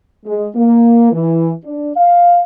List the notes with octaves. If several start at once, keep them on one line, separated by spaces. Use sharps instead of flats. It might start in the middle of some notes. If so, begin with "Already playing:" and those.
G#3
A#3
E3
D4
F5